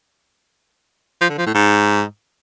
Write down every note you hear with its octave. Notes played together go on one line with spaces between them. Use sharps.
F3
D3
F3
A2
G#2